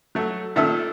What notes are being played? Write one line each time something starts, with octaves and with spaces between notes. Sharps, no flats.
F#3 A3
A#2 D#3 A4 E5 E6